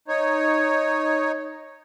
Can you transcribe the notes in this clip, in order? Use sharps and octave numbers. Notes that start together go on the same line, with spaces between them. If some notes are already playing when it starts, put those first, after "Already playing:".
D#4 C#5